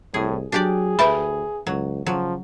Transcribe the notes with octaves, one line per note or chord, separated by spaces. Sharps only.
C2 A2 G#4
F#3 D4 G4 G#4 D5
D2 B4 E5 G5 A5 B5
C#2 F#3
C#3 F3 F#3